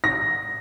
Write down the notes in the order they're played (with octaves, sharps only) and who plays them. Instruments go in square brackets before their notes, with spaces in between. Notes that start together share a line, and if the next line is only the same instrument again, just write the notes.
[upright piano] A#6